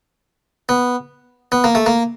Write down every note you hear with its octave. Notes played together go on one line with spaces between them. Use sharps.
B3
B3
A#3
A3
A#3